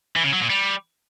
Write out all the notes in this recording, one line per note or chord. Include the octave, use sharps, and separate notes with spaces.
E3
C#3
F#3
A#2
G3